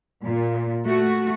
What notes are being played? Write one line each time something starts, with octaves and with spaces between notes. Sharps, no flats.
A#2
A3 F#4